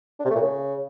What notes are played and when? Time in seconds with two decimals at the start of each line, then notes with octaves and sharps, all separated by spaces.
0.20 D4
0.25 C3
0.30 A3
0.36 A#2
0.41 C#3